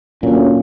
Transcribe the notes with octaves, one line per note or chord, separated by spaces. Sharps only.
D2 A#2 D3 F#3 C#4